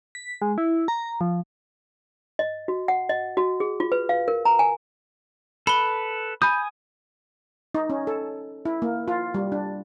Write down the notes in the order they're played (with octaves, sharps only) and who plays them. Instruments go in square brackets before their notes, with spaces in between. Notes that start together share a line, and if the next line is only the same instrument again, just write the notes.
[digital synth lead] B6
G#3
E4
A#5
F3
[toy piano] D#5
F#4
F#5
D#5
F#4
G#4
F4
B4
F5
A#4
A#5
G#5
[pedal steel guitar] A4 B4 [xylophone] B5 G7
[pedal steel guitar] G#5 D#6 [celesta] B5 G6
[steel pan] D#4
C#4
A4
E4
A#3
F4
G3
D4